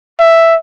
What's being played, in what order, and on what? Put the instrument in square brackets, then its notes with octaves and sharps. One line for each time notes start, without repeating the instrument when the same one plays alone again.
[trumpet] E5